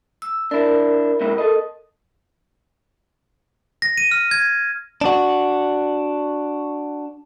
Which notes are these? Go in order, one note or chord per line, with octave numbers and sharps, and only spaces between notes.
E6
D4 E4 A#4
G#2 C3 E4
A4 D#5
A#6
D#7
F6
G#6
D4 F#4